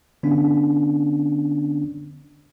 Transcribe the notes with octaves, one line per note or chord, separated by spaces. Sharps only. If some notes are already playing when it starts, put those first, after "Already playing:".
D3 B3 C#4 D4